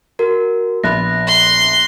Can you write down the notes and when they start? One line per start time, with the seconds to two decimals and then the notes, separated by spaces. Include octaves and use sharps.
0.19 F#4 A#4
0.84 A#1 B3 B5 F#6 A#6
1.27 C6